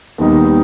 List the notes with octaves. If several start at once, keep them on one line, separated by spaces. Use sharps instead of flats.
D#2 D#3 G3 B3 D#4